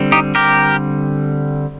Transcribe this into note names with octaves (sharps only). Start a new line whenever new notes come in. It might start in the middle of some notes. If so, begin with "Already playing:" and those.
Already playing: D3 G3 C4
D#4 G4
G4 A#4